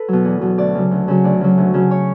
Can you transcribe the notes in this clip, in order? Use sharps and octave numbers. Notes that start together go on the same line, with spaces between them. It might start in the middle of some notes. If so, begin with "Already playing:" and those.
Already playing: A4 B4
B2 F#3
E2
B2 F#3
D2 D5
C#3 F#3
D2
C#3 F#3
D2 D5
C#3 F#3
D2
C#3 F#3
C#5